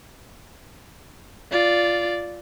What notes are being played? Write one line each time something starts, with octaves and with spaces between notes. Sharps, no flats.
F4 D5